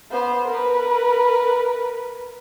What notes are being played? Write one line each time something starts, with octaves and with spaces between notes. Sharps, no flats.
B3 C5
A#4 B4